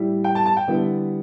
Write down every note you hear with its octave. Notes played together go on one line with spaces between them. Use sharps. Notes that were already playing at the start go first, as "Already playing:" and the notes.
Already playing: A2 G3 E4
G5
A5
A5
G5
D3 G3 B3 E4